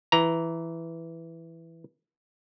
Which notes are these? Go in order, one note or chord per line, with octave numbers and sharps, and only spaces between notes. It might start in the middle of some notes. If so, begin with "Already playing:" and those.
E3 A#5